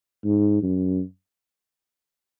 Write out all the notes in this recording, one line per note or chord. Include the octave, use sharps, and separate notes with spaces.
G#2
F#2